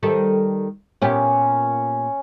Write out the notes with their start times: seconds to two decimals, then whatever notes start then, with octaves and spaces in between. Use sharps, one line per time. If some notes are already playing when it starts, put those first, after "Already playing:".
0.03 D#3 G3 A4
1.02 A#2 B3 C#4 G4